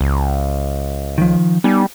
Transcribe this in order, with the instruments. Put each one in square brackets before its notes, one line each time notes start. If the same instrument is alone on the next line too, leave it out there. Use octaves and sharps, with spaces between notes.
[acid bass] C#2
[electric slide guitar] D#3 F3
[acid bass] G3 [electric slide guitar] B3 D#4 G#5